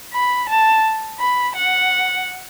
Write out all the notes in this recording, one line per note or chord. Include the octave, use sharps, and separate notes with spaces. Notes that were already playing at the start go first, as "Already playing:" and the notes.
B5
A5
B5
F#5